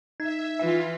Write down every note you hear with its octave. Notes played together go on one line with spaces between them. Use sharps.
D#4 E5 G#6
E3 F4 B4 E5